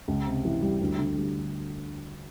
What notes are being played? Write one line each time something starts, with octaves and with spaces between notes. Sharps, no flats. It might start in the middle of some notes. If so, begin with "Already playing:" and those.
C#2
C3
E3
G3
D2
D3
G3